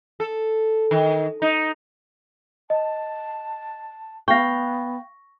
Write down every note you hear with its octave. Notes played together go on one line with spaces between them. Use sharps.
A4
D#3
D#4
D#5 A5
B3 F5 G5 C#6 A#6